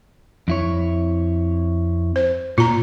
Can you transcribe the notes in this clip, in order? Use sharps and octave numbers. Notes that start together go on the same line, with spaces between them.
F2 E4 C#5
C5
A#2 F4 A#5